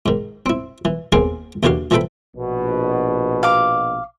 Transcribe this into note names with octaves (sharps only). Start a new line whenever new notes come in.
G#2 D#3
C4 E4
E3
D#2 D#3 B3 C4 G#4 F5
D#2 D3 E3 F#4 G4 F5
E3 F3 E4 A4 G5 B5
A#1 B2
F5 D6